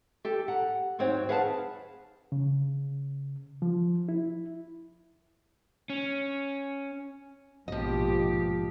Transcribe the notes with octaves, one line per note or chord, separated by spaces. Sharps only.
G4 A4
F#5 A#5
D#2 G#2 F#3 C4 C#5
G#4 B4 F5 F#5 G#5 A5
C#3
F3
E4
C#4
A#1 G#2 B2 F3 G4 D#5